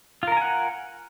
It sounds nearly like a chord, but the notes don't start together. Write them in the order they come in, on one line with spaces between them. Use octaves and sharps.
F4 A#4 A#5 G#5 F#5